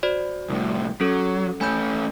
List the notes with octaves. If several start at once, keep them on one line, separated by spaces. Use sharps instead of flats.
F#4 C5 D5
C2 A2
F#3 C#4 A4
A3 C#4 G#5 B5 G6